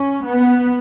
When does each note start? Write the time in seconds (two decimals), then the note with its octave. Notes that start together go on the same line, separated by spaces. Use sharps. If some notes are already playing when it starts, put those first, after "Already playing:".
Already playing: C#4
0.24 B3